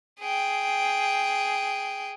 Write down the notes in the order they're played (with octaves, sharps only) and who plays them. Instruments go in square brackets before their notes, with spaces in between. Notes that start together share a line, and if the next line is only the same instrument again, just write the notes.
[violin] G#4 G5